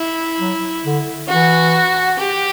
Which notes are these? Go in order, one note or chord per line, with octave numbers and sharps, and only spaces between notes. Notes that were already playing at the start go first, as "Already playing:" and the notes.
Already playing: E4
F#3
D3
E3 F#4
G4